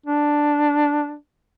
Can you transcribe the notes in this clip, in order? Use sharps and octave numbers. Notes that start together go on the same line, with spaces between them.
D4